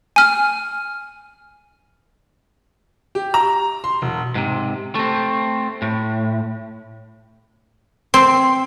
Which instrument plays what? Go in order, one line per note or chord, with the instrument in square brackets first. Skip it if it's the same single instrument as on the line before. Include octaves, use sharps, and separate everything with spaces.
[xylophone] G#5 F6
[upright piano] G4
A#5
C6
E1
[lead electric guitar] G#2 C3
A3 C4
A2
[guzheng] C4